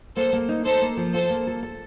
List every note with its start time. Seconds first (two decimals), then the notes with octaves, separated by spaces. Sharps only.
0.16 A#3 A4 C5
0.33 A#3
0.49 D#4
0.65 D#4 A4 C5
0.82 A#3
0.97 F3
1.14 F4 A4 C5
1.30 A#3
1.47 A4
1.63 A4